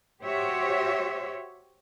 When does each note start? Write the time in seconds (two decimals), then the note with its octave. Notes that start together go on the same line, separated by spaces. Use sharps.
0.24 F#4 G4 C5 C#5 E5